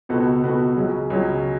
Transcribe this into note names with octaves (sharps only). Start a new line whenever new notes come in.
C#2 B2 B3 F#4 A4
C#2 B2 B3 F#4 A4
C#2 C#3 F#3 C#4
C#2 C#3 F#3 C#4